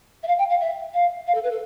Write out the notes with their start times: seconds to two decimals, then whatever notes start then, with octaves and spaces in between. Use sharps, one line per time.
0.23 E5
0.27 F5
0.38 G5
0.49 F5
0.60 E5
0.93 F5
1.27 F5
1.34 A4
1.43 B4
1.51 A4